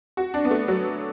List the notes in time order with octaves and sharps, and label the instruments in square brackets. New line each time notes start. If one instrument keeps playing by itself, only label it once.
[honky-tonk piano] F#4
D4
B3
A3
F#3